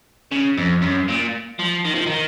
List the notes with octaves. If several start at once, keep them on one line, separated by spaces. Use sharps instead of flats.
C#3
F2
F#2
A#2
F3
D#3
F3
D#3